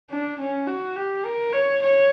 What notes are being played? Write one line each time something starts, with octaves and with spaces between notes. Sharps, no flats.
D4
C#4
F#4
G4
A#4
C#5
C#5